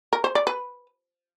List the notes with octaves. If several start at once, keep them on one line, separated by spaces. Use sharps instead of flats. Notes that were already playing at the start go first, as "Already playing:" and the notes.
A#4
C5
D5
B4